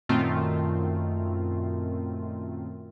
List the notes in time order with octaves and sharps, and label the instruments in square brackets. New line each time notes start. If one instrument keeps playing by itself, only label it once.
[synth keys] F#2 A#2 D#3 A3 C4 F4